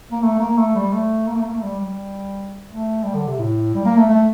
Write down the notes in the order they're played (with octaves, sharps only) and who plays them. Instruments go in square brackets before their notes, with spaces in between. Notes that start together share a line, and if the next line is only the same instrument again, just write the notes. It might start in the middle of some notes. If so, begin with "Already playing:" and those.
[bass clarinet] A#3
A3
A#3
A3
G3
A3
A#3
A3
A#3
A3
G3
G3
A3
G3
D3
C3
A2
G3
A#3
A3
A3